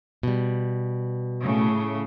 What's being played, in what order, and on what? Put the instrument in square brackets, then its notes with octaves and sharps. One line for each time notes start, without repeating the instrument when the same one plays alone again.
[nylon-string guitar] B2 G3
[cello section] A2 C#3 A3